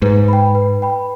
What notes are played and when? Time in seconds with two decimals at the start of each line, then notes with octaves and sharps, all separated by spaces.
0.02 G#2 B4
0.28 G5 B5
0.55 B4
0.82 G5 B5